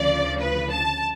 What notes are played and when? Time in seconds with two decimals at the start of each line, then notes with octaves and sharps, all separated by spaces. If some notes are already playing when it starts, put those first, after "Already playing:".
Already playing: D2 C#3 F3 D5
0.41 B4
0.72 A5